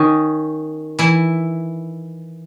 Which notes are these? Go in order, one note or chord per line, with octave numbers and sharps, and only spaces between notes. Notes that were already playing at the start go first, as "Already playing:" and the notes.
Already playing: D#3 C#4 D#4
E3 E4